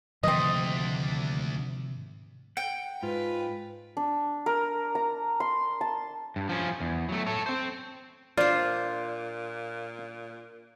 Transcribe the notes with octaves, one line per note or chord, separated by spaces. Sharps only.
D2 G#2 C3 D#3 F3 A3 C4 D#5
F#5 G5
G#2 F4 B4
D4
A#4
A#5
C6
A5
G2
F3 C#4
E2
F#3 A3
A4 C#5
C4 C5
A#2 D4 F4 C5 D5